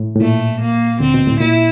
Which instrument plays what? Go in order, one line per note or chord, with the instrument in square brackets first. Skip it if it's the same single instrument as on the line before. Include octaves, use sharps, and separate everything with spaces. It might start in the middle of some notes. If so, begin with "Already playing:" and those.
Already playing: [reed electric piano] A2
A2
[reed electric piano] A#2 [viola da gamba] A3
[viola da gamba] A#3
[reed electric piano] D2 D3 [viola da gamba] C4
[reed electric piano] B2
A2
[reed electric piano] A#2 [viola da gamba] E4